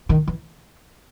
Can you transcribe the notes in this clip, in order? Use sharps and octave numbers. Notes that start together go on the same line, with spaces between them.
D#3
E3